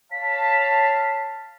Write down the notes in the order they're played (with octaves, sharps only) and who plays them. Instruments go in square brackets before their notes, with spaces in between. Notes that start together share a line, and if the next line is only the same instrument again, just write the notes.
[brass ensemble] C#5 F5 A5 [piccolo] B6